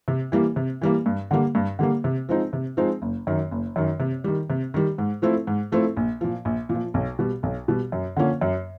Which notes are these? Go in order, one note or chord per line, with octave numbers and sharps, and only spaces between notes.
C3
E3 G3 A#3
C3
E3 G3 A#3
G2
D3 G3 A#3
G2
D3 G3 A#3
C3
F3 G#3 C4 D#4
C3
F3 G#3 C4 D#4
F#1
F#2 D#3
F#1
F#2 D#3
C3
D#3 G3
C3
D#3 G3
G#2
F3 A3 C4 E4
G#2
F3 A3 C4 E4
A#1
A#2 F3
A#1
A#2
F3
B1
B2 G3
B1
B2 G3
F#2
D3 F3 A#3 C#4
F#2